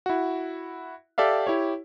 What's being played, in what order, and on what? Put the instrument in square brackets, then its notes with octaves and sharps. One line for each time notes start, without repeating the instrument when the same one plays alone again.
[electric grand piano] E4 F#4
G4 A4 D5 E5 F5
E4 G4 C#5